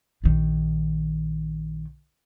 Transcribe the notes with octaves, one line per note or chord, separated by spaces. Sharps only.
A#1 D#3